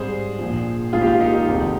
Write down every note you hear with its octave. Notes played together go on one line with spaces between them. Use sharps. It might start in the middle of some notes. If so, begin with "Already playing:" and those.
Already playing: G#2 G3 C4 G#4 C5
A#1 A#2 F3
G#1 G#2 F3 A#3 F4 G#4
G4
F4
D#4 G4
D#4 G4
F1 F2 D#3 G#3 C4